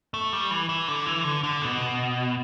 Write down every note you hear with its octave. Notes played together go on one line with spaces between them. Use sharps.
A3
G3
E3
E3
D3
E3
D3
D3
B2